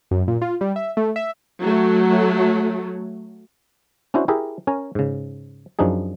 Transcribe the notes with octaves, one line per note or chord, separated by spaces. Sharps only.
F#2
A#2
F4
G3
E5
A3
E5
F#3 A3
C#4 D4 E4 F#4 C5
E4 G4 G#4 A#4 E5
C#4 A#4 G#5
G#2 C#3
F#2 F3 D4 D#4 G#4